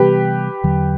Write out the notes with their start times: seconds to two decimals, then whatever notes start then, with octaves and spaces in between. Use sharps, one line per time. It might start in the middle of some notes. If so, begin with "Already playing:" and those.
Already playing: C3 E3 G3 B3 G4 B4
0.64 E2 D3 F#3